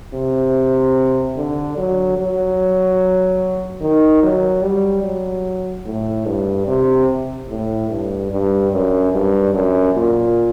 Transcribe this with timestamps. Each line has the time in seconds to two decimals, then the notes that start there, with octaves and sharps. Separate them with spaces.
0.14 C3
1.37 D3
1.77 F#3
2.18 F#3
3.81 D#3
4.23 F#3
4.63 G3
5.04 F#3
5.86 A2
6.26 G2
6.67 C3
7.49 A2
7.89 G2
8.31 G2
8.72 F#2
9.13 G2
9.53 F#2
9.94 A#2